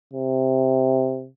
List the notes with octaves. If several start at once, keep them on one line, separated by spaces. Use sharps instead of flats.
C3